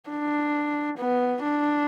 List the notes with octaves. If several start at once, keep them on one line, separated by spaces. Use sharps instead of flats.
D4
B3
D4